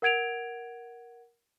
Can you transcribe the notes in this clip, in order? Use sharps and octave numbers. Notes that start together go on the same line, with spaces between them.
A#4 F#5 G#6 D7 F7